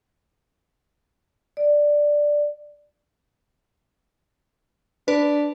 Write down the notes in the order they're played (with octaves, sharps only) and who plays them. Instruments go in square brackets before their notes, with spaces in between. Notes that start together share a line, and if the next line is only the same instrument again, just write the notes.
[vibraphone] D5
[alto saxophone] D4 [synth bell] B4